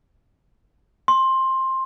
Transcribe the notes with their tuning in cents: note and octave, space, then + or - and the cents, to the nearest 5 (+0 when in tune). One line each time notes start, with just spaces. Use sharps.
C6 +15